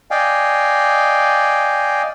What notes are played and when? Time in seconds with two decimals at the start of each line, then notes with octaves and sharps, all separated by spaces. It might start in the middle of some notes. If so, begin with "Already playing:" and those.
0.11 D5 D#5 F5 G5 G#5